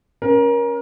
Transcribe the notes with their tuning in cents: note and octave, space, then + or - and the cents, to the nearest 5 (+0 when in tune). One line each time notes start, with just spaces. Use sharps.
C#4 +0 A#4 +25